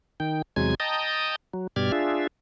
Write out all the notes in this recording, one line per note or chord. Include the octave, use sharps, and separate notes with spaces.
D#3 G5
E2 C3 F#3 G#3 G#5 G#6
D#5 G5 A5 A#5 D#6
F#3
G2 B2 G4 D5 F6 G#6
D4 F4 G#4 E5